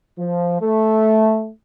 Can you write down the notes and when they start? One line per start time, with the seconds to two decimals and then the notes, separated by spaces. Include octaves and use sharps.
0.19 F3
0.61 A3